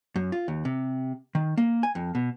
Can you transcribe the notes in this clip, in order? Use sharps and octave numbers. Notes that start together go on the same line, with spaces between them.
F#2
F4
D#2
C3
D#3
A#3
G#5
F2
B2